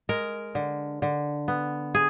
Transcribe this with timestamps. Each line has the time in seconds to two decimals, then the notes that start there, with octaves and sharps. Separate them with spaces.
0.09 G#3 A#4
0.55 D3
1.02 D3
1.48 B3
1.95 G#4